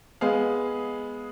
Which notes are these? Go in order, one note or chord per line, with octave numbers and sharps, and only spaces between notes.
G#3 B3 G#4 F5